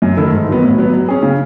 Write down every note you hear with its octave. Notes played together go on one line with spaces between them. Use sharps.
F#2
D#3 A3 E4 A4
G#2
D#3 F#3 B3
A2
F#3 B3
F#3
C#4 G#4
C#3